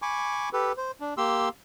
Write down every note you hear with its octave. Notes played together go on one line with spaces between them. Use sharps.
G#5 B5 C#6 D6
G4 A4 B4
C5
D4
A#3 G4 C6 E6